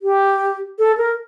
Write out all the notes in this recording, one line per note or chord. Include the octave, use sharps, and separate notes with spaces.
G4
A4
A#4